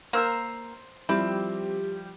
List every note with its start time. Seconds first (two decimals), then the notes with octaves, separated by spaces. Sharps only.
0.13 A#3 A#4 C5 E6
1.09 F3 G3 C4 E4 G4 D6